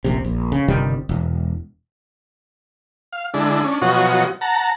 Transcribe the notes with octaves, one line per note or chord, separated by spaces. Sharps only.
D#1 A#1 C3
A#1
C#3
G1 C3 D#3 G3
E1
F5
D3 G#3 D4 E4
C#4 D4
B2 F3 F#3 F#4 C#5 D#5
F#5 A5 A#5